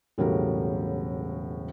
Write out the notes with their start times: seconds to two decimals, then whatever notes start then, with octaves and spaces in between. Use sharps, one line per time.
0.18 E1 A2 C#3 F#3 G3 A#4